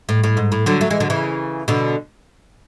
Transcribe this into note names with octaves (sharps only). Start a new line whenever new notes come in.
A2
A2
G#2
A2
D3 F#3
F#3 A3
E3 G#3
D3 F#3
C#3 E3
B2 D3